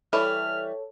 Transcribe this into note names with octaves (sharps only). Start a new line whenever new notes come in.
E3 G3 A4 C#5 E5 F6